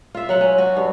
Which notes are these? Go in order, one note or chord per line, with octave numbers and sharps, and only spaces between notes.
F4 E5
F#3 F#5
C#4
F#4
G2